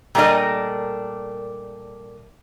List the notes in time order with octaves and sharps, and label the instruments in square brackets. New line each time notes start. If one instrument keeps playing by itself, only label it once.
[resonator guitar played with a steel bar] A#2 G3 A3 D4 A#4 D#5